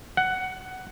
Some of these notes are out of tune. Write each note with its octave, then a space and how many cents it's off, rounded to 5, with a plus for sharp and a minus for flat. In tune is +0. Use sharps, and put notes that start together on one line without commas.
F#5 +10